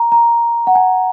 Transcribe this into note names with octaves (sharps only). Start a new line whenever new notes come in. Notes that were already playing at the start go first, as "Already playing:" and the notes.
Already playing: A#5
A#5
F#5
G#5